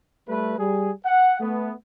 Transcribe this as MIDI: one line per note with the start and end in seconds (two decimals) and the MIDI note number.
0.29 0.55 55
0.29 0.55 57
0.29 0.55 71
0.58 0.91 55
0.58 0.91 68
1.05 1.39 78
1.40 1.72 57
1.40 1.72 59